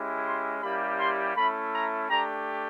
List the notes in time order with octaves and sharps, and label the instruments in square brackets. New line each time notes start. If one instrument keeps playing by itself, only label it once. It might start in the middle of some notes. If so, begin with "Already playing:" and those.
Already playing: [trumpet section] G#3 C#4 E4 G4
C6
G3 A#3 C#4 E4 G4 B5
C6
A3 C#4 E4 B5
A#5
A3 D4 G4 A#5